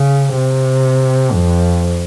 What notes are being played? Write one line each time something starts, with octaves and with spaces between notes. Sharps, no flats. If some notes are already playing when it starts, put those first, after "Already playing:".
Already playing: C#3
C3
F2